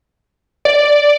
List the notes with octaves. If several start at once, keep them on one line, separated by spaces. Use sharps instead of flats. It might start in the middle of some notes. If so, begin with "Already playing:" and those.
D5